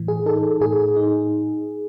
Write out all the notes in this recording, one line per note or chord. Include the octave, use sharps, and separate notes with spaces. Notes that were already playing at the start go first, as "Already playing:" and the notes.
Already playing: A2 E3
G#4
D#4 A4
A2 G#4
D#4